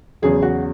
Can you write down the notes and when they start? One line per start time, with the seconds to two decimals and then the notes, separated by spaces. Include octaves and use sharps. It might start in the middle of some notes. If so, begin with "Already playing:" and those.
0.22 E2 C#3 F#3 G#4
0.42 F#4